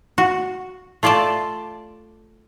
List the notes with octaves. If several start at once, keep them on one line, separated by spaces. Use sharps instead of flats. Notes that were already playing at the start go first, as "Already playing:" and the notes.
F#4
A3 F4 D5 G5 A5